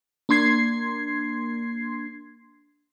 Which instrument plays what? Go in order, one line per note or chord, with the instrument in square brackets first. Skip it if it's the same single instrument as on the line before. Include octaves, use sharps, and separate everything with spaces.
[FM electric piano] A#3 D4 C6 G#6 C7